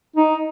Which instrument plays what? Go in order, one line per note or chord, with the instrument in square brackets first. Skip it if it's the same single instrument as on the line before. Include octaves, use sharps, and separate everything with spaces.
[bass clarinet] D#4